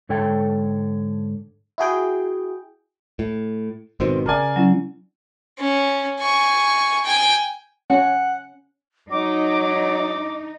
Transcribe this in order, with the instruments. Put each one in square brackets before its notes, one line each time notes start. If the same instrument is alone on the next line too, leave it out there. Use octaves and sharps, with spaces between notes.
[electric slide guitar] G#2 D3 A4 C#5 G5
[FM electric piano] E4 F#4 G#4 G5
[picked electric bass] A2
[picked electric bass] G#1 B2 D#3 [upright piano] C4
[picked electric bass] C#3 [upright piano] A#4 D5 G#5
[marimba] F#3 C#4 E4
[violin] C#4
G#5 C#6
G5 G#5
[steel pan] C#4 [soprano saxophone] F#5
[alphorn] F#3 [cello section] D#4 [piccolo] D6